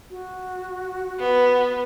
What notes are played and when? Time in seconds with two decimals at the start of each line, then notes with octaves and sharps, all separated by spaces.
0.11 F#4
1.19 B3